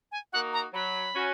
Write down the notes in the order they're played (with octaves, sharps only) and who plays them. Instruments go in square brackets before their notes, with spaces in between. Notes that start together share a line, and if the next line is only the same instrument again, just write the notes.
[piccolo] G#5
[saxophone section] A#3 D#4 F#4 [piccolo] F#5
[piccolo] A#5
[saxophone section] F#3 [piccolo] B5
[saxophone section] C#4 F#4